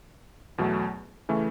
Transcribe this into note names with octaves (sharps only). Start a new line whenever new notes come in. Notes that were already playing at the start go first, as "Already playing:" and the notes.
E2 B2 F#3 A3
C#3 E3 A3 C#4